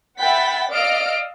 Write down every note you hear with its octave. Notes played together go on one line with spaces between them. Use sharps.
E5 F#5 G5 B5 A6 B6
D5 D#5 F5 E6 F6 D7